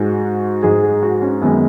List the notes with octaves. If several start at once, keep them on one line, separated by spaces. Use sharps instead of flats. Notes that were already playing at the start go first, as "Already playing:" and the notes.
Already playing: G#2 G#3 F#4
G#2 G#3 G#4
G#4
F#4
C#4
F#2 D#3 G#3 B3